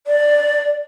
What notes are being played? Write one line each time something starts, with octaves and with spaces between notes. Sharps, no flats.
D5